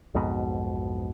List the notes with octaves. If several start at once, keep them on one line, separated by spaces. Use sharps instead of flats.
B1 F2 G#2 B2